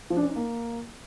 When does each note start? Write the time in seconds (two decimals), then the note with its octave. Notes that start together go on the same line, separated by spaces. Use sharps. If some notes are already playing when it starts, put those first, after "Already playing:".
0.10 F3
0.17 D4
0.23 C#4
0.30 D#4
0.36 A#3